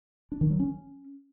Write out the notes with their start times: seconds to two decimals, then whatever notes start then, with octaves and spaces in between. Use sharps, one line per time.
0.32 D4
0.41 D#3
0.50 F#3
0.60 C#4